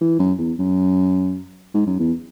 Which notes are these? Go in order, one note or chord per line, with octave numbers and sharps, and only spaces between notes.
E3
F#2
E2
F#2
G#2
F#2
E2